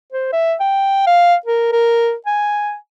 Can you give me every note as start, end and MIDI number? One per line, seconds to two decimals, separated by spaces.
0.13 0.31 72
0.32 0.55 76
0.60 1.02 79
1.07 1.35 77
1.46 1.68 70
1.72 2.14 70
2.26 2.75 80